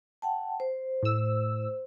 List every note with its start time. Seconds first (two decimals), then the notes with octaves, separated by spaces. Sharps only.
0.22 F#5 G5 A5
0.60 C5
1.03 A2 E6